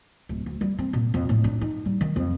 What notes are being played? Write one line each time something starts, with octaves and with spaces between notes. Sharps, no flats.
D1
D2
G3
C4
A#2
F2
A2
D4
D#4
G3
D#3
F2